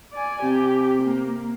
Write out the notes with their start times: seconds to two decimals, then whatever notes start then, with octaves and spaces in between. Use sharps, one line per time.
0.13 D5 G#5
0.43 C3 G4
1.03 A#3